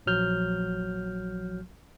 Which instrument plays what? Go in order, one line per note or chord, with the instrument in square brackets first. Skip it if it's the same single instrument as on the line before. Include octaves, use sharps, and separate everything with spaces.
[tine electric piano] A#1 F3 F#3 F6 G6